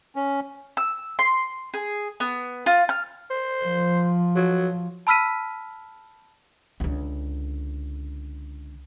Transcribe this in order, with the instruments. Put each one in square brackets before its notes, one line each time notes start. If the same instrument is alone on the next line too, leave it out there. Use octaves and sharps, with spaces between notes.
[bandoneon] C#4
[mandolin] E6
C6
G#4
B3
F4
F6
[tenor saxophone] C5
[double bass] F3
[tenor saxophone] F#3
[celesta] A5 B5 E6 F6 B6 D#7
[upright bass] C#2 D3